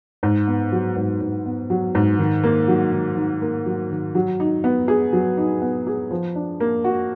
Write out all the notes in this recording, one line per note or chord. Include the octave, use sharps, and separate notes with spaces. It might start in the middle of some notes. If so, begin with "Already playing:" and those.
G#2
B3
F#3
G#2
G#2
B3
F#3
G#2
D#3
A#3
F#3
D#3
D#3
A#3
F#3
D#3
F#3
D#4
B3
G#4
F#3
D#4
B3
G#4
F3
D4
A#3
F#4